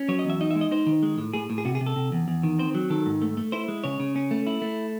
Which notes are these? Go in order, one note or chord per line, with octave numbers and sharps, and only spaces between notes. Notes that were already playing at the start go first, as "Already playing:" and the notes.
Already playing: C#4
F#3 C#5
D#5
E2 E5
D#4 D#5
E5
G#3
D#5
D#4 C5
D#3
G#3
A2
A2 G#4
A2
G#4
C3 F#4
G#4
C3
A4
C3
E2
E2
D#3
C4 C5
F#3
D#3 A4
G#2
A3
A3
E4 C5
G#3
C#3 C#5
C#3
C#4
A3
E4
A3